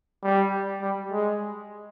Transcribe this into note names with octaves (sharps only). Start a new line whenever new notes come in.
G3
G3
G#3